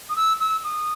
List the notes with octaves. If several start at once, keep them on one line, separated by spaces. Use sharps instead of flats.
D#6
E6
E6
D#6